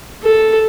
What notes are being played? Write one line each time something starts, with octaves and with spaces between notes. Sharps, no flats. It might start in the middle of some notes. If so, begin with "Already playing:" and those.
A4